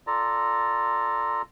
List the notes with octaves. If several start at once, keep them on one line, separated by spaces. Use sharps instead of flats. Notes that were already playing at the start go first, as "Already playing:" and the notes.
F4 A4 D5 A#5